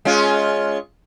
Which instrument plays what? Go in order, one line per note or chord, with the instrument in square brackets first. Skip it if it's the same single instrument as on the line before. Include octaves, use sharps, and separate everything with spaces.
[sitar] G#3 C#4 F4